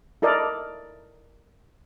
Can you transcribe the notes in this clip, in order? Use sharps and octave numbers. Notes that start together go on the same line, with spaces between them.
E4 A4 A#4 D5 D#5